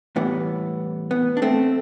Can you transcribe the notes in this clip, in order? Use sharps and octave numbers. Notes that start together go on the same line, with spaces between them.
A2 E3 G3 B3
B3
D4
A3 C4